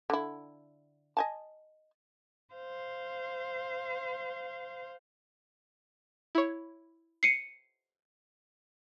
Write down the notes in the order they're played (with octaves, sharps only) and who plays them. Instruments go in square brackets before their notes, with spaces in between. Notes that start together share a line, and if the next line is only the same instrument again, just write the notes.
[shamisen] D3 E4
D#5 G#5 A5
[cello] C5 F5
[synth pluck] E4 C#5
[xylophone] C7 C#7 D#7